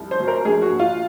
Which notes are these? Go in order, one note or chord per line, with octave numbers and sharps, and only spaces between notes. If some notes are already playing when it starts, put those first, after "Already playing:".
Already playing: C2 F3
C5
F#3
A#4
A#1 G#4
F#4
A#2
F4